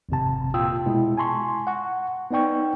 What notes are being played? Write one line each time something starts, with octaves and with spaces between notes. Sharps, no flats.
G#1 F2 C3 A5
A#2 F4 G5 D#6 E6
B2 G#3 E4
G#5 A5 C6 C#6
F#5 C#6
B3 D#4 D5 G5 C#6